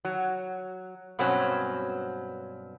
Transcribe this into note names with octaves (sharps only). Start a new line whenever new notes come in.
F#3
G2 B2 F#3 C4 C#4